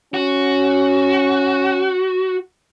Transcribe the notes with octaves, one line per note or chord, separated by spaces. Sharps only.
C#4 F#4